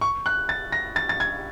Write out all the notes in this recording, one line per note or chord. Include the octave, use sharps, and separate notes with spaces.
C#6
F#6
A6
A#6
A6
A6
G#6